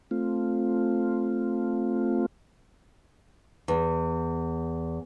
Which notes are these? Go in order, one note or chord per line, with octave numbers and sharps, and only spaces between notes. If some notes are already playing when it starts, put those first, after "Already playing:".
A3 C4 F4
E2